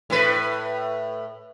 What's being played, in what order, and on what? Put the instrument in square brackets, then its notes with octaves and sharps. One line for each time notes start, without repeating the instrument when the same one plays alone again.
[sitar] A2 B4